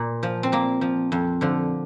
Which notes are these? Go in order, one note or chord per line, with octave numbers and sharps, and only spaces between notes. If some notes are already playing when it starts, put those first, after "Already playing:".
Already playing: A#2
F3
C4
A#2 A#3
F3
F2
D3 F3